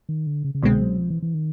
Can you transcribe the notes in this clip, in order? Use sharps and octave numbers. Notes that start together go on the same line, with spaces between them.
D#3
D3
C#3
C#3
C2 B2 D3 G#3 C4
F#3
F3
E3
E3
D#3